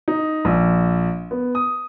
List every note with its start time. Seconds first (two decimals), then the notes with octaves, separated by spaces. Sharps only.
0.08 D#4
0.45 A#1
1.31 B3
1.55 D#6